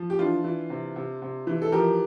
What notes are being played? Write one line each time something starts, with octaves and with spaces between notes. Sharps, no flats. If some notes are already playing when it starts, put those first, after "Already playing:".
Already playing: F3
G4
E3 D4 F4
E3
C3
C3
C3
E3
A4
F3 G4 A#4